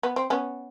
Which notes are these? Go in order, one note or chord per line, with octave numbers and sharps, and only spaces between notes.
B3
C4
B3 C#4